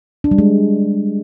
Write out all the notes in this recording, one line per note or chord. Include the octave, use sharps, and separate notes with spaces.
D4
G3
G#3